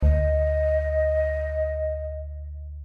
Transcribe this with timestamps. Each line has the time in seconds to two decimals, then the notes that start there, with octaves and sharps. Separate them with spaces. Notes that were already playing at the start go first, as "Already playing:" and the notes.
0.03 D2 D#5